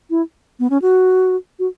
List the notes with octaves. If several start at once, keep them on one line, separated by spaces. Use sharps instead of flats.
E4
B3
C#4
F#4
F#4